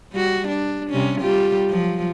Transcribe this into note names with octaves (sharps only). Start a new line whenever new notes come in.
G3 F#4
D4
C3 G3 C#4
G3 F4 G4
F3 F#3